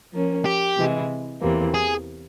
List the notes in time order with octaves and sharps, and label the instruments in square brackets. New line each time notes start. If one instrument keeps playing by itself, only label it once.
[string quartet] F3 A#3 C#4
[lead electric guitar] G4
[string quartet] C3 E3 G#3 E4
E2 C3 E3 A#3
[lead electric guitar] G#4